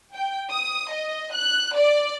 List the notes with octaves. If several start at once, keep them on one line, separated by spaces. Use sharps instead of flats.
G5
D#6
D#5
F#6
D5